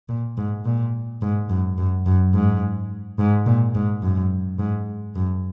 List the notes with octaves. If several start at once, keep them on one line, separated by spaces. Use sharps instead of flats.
A#2
G#2
A#2
G#2
F#2
F#2
F#2
G#2
G#2
A#2
G#2
F#2
G#2
F#2